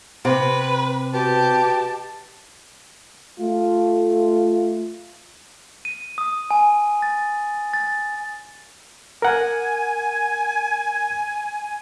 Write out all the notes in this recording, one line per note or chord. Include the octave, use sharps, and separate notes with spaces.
C3 B4
B2 G4 A5
A3 F4
D#7
D#6
G#5
A6
A6
A#4 F#5 G#5